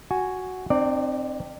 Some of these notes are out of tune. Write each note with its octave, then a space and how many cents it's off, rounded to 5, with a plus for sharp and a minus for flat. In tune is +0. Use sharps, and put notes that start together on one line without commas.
F#4 +0 G#5 +0
C4 +0 D#4 -45 D5 +0